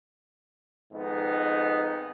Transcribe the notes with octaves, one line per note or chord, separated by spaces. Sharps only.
F2 G#2 D#3 B3 D#4